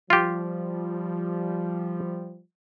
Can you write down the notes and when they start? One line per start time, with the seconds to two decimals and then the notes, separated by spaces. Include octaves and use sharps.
0.10 F3 G3 F4 G4